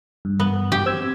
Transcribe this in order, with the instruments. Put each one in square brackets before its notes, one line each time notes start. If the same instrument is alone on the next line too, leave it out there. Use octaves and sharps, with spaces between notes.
[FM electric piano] G2
[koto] B3
G4
[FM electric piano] C4 E6 G#6